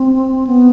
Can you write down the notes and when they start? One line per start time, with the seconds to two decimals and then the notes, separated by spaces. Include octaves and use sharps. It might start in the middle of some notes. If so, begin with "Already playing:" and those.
Already playing: C4
0.47 B3